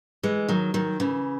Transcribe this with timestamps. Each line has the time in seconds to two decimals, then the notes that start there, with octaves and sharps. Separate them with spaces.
0.23 E3 G#3
0.49 D#3 F#3
0.74 D#3 F#3
1.00 C#3 E3